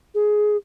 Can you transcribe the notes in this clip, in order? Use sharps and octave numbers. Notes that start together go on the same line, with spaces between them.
G#4